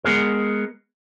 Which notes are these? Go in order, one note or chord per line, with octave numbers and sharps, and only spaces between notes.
G#3 B3 G#4 A#4